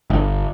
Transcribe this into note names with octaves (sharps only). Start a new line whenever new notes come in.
G1